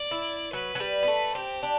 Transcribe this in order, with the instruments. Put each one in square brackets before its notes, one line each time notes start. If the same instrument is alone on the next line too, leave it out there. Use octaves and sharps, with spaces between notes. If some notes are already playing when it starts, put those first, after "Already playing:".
Already playing: [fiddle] D5
[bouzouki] E4
[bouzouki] F#3 [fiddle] B4
[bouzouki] F#3
G3
B3
A3
[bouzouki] C4 [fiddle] G4
[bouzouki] D4